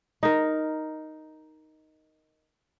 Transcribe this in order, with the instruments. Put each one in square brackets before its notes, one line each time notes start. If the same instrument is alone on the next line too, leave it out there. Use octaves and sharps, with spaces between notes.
[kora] D#4 A#4